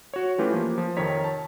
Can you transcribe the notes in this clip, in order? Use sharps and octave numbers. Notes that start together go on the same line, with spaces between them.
F#4 C#5
E3 A3 C#4 F4 G4 B4
F3 A#3
F3
F2 C3 D#3 C#5 A#5 B6
A5